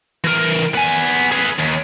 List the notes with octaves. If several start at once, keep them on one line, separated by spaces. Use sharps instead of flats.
E3 A#4
B3 G#5
G#4 B4
D#2